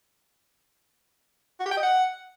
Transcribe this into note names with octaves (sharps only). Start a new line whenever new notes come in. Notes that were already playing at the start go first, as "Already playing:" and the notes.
F#4
G4
G5
D#5
F#5